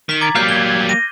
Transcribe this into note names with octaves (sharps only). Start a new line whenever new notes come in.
D#3 B6 F#7
A#5 D6 G#6 A6
F#3 G3 A#3 F5 F6 G6 C7
G#6 G7
G#6
A#6 D#7